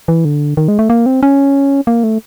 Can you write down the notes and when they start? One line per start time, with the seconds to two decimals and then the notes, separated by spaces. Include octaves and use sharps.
0.08 E3
0.25 D3
0.57 D#3
0.68 G#3
0.79 A3
0.90 A#3
1.06 C4
1.23 C#4
1.87 A#3
2.04 A3